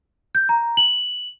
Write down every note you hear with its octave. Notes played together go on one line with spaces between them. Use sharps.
G6
A#5
F#7